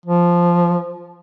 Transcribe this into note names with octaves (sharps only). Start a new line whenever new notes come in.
F3